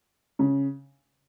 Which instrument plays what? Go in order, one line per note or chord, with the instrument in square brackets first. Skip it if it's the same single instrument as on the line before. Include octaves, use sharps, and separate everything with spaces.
[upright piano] C#3